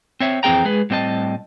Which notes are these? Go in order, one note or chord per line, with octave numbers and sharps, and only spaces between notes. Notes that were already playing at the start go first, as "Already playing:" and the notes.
C4 C#5 E5
F2 E3 C4 G#4 G5 A#5
G#3 G#4 B4
A2 G3 C4 D#5 A5